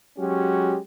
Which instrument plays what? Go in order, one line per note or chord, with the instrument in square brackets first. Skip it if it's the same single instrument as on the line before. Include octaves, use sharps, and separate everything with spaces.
[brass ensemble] F#3 G#3 C#4 F#4 G4